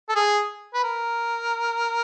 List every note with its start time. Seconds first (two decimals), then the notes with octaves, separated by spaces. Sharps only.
0.09 A4
0.15 G#4
0.74 B4
0.84 A#4